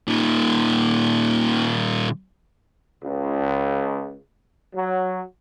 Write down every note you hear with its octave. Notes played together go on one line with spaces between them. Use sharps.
A#2 D#3
C#2
F#3